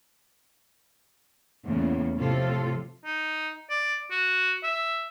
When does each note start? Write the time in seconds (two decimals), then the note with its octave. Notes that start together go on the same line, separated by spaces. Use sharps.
1.65 E2 A2 C#3 A#3 B3
2.17 A2 C3 F3 F4 A4
3.05 D#4
3.70 D5
4.11 F#4
4.63 E5